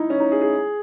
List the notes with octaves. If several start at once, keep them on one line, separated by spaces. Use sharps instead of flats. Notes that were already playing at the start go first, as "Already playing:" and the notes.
Already playing: D#4 E4
C#4
D#4
G#4
G#4